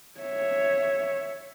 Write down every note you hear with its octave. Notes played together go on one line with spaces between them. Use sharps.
C#5 E5